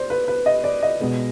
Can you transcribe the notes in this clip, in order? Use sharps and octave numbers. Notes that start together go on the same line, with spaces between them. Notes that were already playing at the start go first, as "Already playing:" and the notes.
Already playing: C5 D5
B4
B4
D#5
D5
D#5
B2 G#3 B3